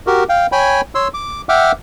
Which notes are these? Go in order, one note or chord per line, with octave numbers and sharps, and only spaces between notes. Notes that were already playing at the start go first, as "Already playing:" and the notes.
F#4 G4 A#4
F5 G5
C#5 G5 G#5 B5
C#5 C6 E6
D6
E5 F#5 G5 D6 F6